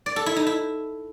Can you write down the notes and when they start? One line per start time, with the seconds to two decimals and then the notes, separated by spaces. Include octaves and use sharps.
0.06 D5
0.16 A4
0.26 E4
0.36 D#4
0.47 E4